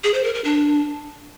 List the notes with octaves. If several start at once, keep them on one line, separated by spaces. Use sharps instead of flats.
G#4
C5
A#4
A#4
D4